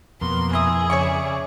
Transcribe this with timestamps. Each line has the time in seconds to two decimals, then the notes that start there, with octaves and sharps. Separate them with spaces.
0.21 F2 B2 A#3 C6
0.53 E4 G#4 D#6
0.90 C#3 C#5 D5 E5 C#6